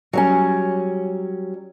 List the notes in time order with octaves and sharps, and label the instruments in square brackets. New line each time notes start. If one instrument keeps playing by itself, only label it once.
[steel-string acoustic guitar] F#3 G3 C#4